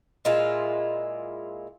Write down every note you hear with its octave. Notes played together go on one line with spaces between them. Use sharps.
A#2 G#3 E4 F4